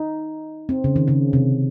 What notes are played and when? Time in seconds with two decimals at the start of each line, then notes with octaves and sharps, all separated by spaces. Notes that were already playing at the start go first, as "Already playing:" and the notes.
Already playing: D#4
0.69 C4
0.84 C#3
0.96 D#3
1.08 C#3
1.33 C3